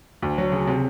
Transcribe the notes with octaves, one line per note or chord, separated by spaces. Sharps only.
D2
F#3
C#3
C3